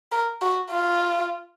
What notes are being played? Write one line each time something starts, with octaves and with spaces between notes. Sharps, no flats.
A#4
F#4
F4